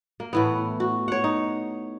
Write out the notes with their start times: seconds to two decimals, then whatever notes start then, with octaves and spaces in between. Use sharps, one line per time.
0.20 A#3
0.33 A2 E3 B3
0.80 F#4
1.08 C#5 F#5
1.24 D#4